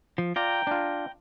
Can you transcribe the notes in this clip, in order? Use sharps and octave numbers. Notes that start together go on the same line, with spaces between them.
F3
F4 D5 G5 A#5
D4 F4